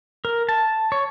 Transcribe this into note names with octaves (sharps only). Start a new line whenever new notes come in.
A#4
A5
C#5